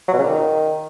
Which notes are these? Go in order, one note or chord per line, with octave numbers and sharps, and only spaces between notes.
F#3
B2
C#3
A#2
D#3